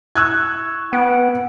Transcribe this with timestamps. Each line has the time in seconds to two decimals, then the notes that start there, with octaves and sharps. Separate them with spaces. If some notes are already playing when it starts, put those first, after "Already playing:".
0.15 E4 C#6 E6 F#6 G#6
0.93 B3 F#5 G5 D7